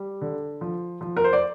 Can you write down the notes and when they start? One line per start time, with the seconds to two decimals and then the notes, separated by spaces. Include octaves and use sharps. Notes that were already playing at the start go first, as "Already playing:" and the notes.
Already playing: G3
0.21 D3
0.61 F3
1.01 F3
1.17 A#4
1.24 C5
1.33 D5